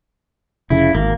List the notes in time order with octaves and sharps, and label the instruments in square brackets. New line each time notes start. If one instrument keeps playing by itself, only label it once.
[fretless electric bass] F1 C#3 [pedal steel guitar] E4
[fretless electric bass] G#1 [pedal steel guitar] A#3